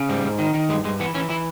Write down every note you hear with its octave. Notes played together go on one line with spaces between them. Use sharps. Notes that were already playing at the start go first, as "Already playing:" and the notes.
Already playing: C#3
G#2 G3
G#2
D#3
D#3
G2 G#3
G2 G#3
E3 B3
E3 C#4
E3 E4